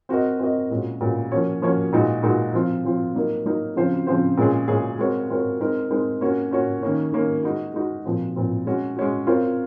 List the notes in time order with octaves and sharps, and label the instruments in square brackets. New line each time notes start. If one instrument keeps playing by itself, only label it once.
[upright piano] C4 F#4 A#4 D#5
C4 F#4 A#4 D#5
A#2 G#3 C#4 F#4
A#2 G#3 C#4 F#4
F3 A#3 C#4 F#4 C#5
F3 A#3 C#4 F#4 C#5
A#2 G#3 D#4 F#4
A#2 G#3 D#4 F#4
F3 C4 F4
F3 C4 F4
F#3 A#3 D#4 A#4
F#3 A#3 D#4 A#4
C#3 F3 C4 F4 C5
C#3 F3 C4 F4 C5
A#2 G#3 C#4 G#4
A#2 G#3 C#4 G#4
G#3 C4 F#4 A#4 C#5
G#3 C4 F#4 A#4 C#5
G#3 C4 D#4 A#4
G#3 C4 D#4 A#4
A#3 C#4 F#4 C#5
A#3 C#4 F#4 C#5
D#3 A#3 C#4
D#3 A#3 C#4
G#3 D#4 F#4
G#3 D#4 F#4
A#2 F3 C4
A#2 F3 C4
G#3 C#4 F#4
G#3 C#4 F#4
C4 F4 A#4 C#5